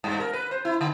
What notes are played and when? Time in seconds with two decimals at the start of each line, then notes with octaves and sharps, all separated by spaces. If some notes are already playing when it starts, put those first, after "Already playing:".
0.04 G2
0.20 A#4
0.33 B4
0.51 C5
0.65 E4
0.81 D3